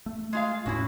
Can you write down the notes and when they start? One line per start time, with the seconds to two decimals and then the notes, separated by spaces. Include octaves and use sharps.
0.06 A3
0.33 G#3 F4 F5
0.66 E1 A2 C#4 E4 F#4